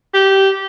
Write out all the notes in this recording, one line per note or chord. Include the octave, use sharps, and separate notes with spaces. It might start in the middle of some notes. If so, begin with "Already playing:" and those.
G4